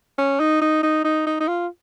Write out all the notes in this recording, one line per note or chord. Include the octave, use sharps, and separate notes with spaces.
C#4
D#4
D#4
D#4
D#4
D#4
D#4
F4